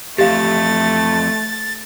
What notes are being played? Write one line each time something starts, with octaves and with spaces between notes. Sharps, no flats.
F2 E3 A3 G4 F5 A6